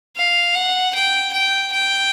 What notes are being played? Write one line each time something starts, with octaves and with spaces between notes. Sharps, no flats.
F5
F#5
G5
G5
G5